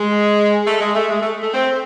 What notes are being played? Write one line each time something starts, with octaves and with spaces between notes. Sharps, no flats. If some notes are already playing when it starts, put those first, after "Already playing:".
Already playing: G#3
A3
G#3
A3
G#3
A3
A3
C4